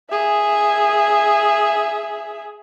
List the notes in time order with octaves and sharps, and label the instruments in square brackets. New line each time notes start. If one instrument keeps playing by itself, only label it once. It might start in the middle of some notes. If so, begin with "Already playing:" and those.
[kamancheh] G#4 E5